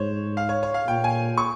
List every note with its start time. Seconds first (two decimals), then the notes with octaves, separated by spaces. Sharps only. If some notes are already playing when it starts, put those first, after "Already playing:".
Already playing: G#2 C5 C#5
0.37 F5
0.49 C#5
0.63 C#5
0.74 F5
0.87 A#2 G5
1.04 G#5
1.38 C#6